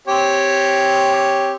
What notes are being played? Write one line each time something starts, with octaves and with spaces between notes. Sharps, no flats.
C4 G4 C#5